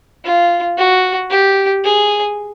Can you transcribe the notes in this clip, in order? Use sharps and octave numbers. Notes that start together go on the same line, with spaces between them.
F4
F#4
G4
G#4